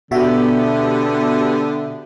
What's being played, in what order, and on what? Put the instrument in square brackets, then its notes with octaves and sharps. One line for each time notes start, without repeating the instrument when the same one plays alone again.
[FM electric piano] B2 F#4 E5 [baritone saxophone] D3 [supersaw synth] B3 G4